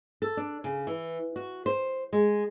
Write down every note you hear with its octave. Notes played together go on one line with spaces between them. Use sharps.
A4
D4
C#3
E3
F#4
C5
G#3